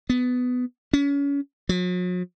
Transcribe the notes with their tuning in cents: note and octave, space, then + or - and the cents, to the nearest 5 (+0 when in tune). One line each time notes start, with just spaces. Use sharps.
B3 +15
C#4 +30
F#3 -45